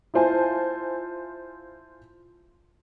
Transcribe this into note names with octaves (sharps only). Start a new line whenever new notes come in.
E4 F4 C5 G#5 A5